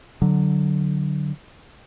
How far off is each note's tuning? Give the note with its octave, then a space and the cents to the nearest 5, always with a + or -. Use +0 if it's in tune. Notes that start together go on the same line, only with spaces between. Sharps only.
D3 +0 F#3 +0